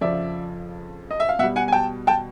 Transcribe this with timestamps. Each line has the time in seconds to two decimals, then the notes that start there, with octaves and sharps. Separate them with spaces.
0.01 F2 C#3 F3 D5 E5
1.11 D#5
1.20 E5
1.29 F5
1.39 B2 E5 F#5
1.43 G3
1.56 F#5 G#5
1.68 G#5
1.72 G5 A5
2.07 G5 A5